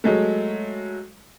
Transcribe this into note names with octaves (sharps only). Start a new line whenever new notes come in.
F#3 G#3 A3